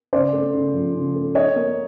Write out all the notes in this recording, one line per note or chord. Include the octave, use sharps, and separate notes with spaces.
C#3 C5 D5
A3
C#3
F3
C#3
A3
D4 C#5 D#5
A#3